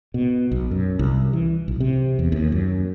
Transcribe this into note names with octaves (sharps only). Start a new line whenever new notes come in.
B2
B1
F#2
C2
E3
B1
C3
E2
D#2
F#2